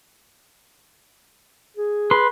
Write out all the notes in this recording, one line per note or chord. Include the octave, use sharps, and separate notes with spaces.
G#4
B4 C6